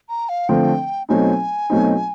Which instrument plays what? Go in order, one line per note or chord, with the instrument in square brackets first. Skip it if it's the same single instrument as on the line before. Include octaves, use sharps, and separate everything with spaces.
[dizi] A#5
F5
[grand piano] D3 F3 A3 C4 [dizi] G5
[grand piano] B2 F#3 A3 C4 D#4 [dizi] G#5
[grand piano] B2 F#3 A3 C4 D#4